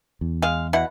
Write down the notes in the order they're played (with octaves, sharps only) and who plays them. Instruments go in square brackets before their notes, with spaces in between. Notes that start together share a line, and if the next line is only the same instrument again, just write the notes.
[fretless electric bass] E2
[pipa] G#3 F5
B2 E4 F#5